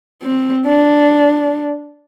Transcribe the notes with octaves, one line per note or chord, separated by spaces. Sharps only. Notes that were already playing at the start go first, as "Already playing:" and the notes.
C4
D4